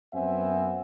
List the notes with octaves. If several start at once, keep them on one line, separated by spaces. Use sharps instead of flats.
F#2 B3 C4 E5 F#5 G#5